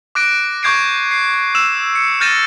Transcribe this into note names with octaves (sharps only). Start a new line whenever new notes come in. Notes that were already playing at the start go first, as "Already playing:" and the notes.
D6 F#6 A#6 D7
C#6 D6 G6 G#6 C7 D7
C7
E6 E7
C#7
F6 G6 A6 A#6 D#7 E7